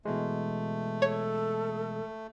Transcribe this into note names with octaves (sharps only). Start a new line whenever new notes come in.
B2 E3 G#3 A3
A4 C#5